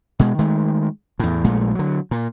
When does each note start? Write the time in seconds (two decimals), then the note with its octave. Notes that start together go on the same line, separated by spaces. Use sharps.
0.19 B2 G#3
0.39 D#3 G#3 A3
1.19 E2 A2
1.44 A#1 A#2 G#3 A3
1.75 D3 F#3
2.11 A#2